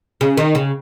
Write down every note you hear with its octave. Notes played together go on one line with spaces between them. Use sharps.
C#3
D#3
C#3